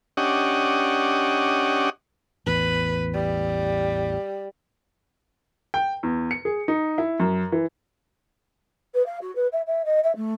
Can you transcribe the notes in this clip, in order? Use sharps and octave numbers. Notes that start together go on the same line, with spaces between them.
C#4 D4 G4 D#5 F#5
A1 E2 B4
G3
G5
E2
C#7
G#4
D#4
E4
F#2
E3
B4
F5
F#4
B4
E5
E5
D#5
E5
A3